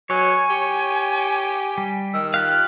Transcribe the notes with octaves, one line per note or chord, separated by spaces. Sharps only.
F#3 C#5 G#5
G4
G3
D#3 E6
F4 G4 F5 F#6